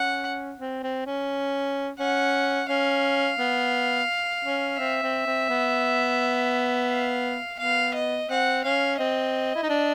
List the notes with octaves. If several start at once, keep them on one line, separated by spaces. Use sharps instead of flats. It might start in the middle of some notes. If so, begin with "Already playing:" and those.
Already playing: C#4 F#5
C4
C4
C#4
C#4 F#5
C#4 F5
B3
C#4
C4 E5
C4
C4
B3
F5
B3 F5
D#5
C4 F#5
C#4 F5
C4 D#5
E4
D#4
D4